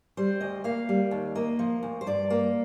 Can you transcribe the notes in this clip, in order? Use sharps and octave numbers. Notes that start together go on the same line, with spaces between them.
G3 C5
D2 D#5
A#3 F5
G3
D#2
A#3 D#5
F3
D2
C5
G2 D5
A#3